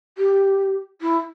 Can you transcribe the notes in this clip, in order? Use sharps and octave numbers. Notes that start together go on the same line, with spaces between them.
G4
E4